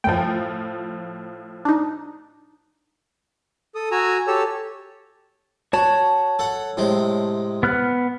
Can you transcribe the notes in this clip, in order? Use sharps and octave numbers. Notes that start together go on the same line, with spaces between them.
F#2 A2 F3 G5
D4 D#4
A4 D#6
F#4 G#5 A#5 E6
G4 A4 C#5 A5 E6
F#4 C#5 A5
A4 F#5
A2 C3 G#3
B3 F6 F#6